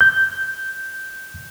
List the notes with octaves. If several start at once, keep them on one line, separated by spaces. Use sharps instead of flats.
G6